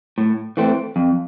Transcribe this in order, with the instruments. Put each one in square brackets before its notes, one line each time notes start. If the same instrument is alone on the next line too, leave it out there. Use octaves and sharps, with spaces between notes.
[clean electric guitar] A2
E3 A3 C4
F2